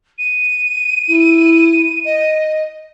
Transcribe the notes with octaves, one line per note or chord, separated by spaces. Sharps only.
D#7
E4
D#5